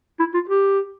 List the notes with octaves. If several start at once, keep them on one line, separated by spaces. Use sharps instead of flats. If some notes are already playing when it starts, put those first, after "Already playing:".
E4
F4
G4